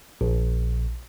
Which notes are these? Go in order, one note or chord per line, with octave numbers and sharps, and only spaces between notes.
A#1